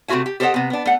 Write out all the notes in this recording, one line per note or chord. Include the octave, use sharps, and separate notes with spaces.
C3 A3 F4 F#4 E5 G#5
G4
G4 A4 C5 C#5 D#5 F#5
C3 B3
B3 D4
A3 F#5